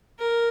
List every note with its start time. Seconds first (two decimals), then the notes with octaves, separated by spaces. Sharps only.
0.19 A#4